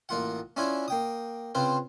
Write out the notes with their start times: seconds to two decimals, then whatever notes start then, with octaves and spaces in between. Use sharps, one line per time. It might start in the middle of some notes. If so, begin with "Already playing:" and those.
0.09 A1 A#3 F4 F#5
0.57 C#4 D4 E4 F4 G#5
0.88 A#3 G5 D#6
1.55 C#3 C4 F4 B4 C5